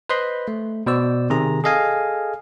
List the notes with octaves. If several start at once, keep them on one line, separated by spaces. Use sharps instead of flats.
B4 C5 D#5 B5 C6
A3
B2 C5 D5 E6
C3 D#3 G#4 A#5
G#4 A4 D#5 F5 G#5